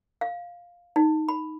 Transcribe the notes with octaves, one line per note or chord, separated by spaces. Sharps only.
F5
D#4
B5